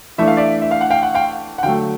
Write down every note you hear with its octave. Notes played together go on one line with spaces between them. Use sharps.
E3 A3 D4 E5
F5
D5 E5
E5
F5
F#5
F5 G5
F#5
F5 G5
F#5
D3 F#3 A3 F5 G5